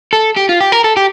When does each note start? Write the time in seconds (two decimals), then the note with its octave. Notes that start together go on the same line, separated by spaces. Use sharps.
0.13 A4
0.36 G4
0.49 F4
0.60 G4
0.72 A#4
0.84 A4
0.97 G4